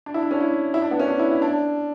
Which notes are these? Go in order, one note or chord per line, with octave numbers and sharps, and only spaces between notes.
D4
E4
D4
C#4
E4
E4
D4
B3
C#4
D4
E4
E4
D4